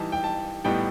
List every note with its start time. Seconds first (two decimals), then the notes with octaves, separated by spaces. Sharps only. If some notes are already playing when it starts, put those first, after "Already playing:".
Already playing: E3 G3 D#4 A5
0.12 G5
0.24 A5
0.65 A2 G3 B3 D#4 G5